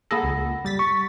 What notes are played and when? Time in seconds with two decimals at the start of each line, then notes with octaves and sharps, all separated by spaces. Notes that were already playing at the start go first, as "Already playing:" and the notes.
0.11 A#3 G#4 A4 F#5 B5 A#6
0.24 C#2
0.65 G3 A6 B6
0.79 C#6